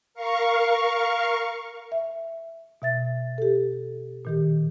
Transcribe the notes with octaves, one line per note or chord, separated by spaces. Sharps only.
A#4 F5 C#6
E5
B2 E5 A6
G4 A4
A#2 D#3 G4